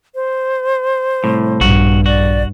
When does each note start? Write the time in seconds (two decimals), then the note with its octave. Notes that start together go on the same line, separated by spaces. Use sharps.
0.15 C5
1.24 C2 A2
1.61 A#1 G2 F#4
2.06 F#4 D5